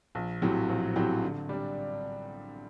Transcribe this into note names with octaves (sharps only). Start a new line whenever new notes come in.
A#1
A2 F#3 C4 G4
A#1
A2 F#3 C4 G4
D3
G3 D4